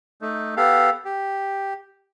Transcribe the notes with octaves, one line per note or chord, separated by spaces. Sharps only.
A3 D#4
B3 G4 A4 F5
G4